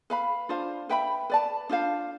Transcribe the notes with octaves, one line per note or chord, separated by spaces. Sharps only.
B4 F5 B5
D4 F4 C5 F5
B4 E5 G5 B5
B4 D5 A5
D4 F4 C5 F5